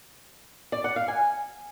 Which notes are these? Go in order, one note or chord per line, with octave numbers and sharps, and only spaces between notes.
D5
F#5
F5
G#5